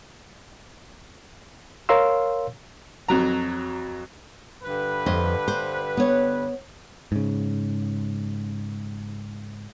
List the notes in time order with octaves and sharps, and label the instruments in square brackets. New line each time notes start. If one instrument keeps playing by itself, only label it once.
[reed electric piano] A#4 C#5 F5 C6 E6
[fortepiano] F2 F#3 A#5
[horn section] G2 D3 B4
[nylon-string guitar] F2 D#5
C5
B3 C#5
[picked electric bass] G#2 C#3